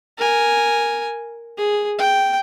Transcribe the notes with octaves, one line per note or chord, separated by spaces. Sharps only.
A#4 G#5
G#4
G5